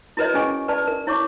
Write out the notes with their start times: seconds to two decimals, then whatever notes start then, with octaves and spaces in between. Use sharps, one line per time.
0.17 E4 F#4 A#4 B4 C#5 D#5
0.34 C#4 G4 G#4 G#5 C#6
0.68 B4 D5 A5
0.87 A#4
1.07 E4 C#5 C#6 D6